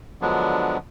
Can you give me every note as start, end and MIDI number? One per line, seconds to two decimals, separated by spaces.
0.21 0.78 50
0.21 0.78 53
0.21 0.78 54
0.21 0.78 56
0.21 0.78 59
0.21 0.78 62